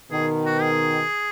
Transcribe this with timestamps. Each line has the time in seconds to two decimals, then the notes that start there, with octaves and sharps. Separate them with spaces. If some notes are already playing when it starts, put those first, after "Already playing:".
0.11 B2 D#3 G#4
0.46 F#4
0.62 G#4